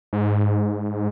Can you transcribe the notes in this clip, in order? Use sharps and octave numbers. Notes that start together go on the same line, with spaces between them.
G#2